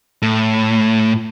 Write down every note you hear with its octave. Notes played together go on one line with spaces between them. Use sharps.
A2